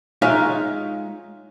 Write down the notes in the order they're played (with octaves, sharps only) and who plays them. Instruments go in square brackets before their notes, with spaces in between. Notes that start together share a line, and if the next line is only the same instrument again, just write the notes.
[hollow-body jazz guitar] G#3 D#4 F4 C#5 E5 F5